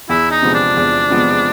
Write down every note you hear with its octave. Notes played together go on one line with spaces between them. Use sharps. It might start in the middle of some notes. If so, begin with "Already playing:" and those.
E2 E4
D#4
C3 F3 G#3 B3
D4
E2
C3 F3 G#3 B3